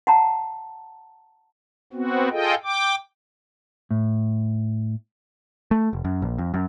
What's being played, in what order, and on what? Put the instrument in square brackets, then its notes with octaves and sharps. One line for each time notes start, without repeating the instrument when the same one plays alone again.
[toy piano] F#5 A5 A#5
[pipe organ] B3 C4 F#4
F4 G#4 A4 D#5 G5
G5 D6
[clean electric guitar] A2
[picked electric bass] A3
F1
F#2
A#1
F2
F#2